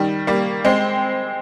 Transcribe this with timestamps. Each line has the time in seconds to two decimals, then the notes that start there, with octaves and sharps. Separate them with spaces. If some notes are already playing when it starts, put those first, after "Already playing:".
Already playing: D#3 G3
0.27 G3 A#3
0.65 G#3 C4